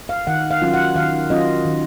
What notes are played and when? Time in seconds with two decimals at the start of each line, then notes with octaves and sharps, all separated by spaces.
0.09 F5
0.27 D#3 F#5
0.51 F5
0.62 F#3 C#4 F4
0.74 F#5
0.95 D#3 F5
1.30 F#3 C#4 F4 D#5
1.65 D#3